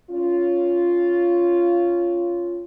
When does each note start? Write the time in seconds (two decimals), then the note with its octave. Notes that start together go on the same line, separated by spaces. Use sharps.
0.10 C#4 F4